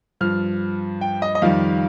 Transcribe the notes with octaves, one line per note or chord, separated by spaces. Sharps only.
G2 F3 F6
G5
D#5
D#5
F2 D#3 G3 F5